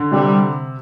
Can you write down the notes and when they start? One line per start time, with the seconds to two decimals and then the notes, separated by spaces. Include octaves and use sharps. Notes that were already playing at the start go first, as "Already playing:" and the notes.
Already playing: D3
0.12 C3 G3